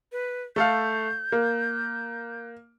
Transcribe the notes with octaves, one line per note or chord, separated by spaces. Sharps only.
B4
A3 A4 F5 G6
A#3